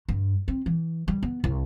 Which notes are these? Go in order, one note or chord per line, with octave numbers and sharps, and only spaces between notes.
G2
C4
E3
G3
B3
C2